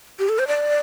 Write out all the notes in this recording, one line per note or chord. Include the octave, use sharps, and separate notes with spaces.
G4
A4
C5
D5